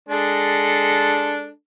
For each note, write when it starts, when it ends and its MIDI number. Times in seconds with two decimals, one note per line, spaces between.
0.09 1.49 56
0.09 1.49 62
0.09 1.49 69